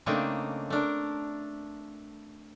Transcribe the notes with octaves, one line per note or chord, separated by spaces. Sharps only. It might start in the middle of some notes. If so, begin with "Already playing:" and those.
C#3 A3 A#3 C4 D4 D#4
A3 D4 A#4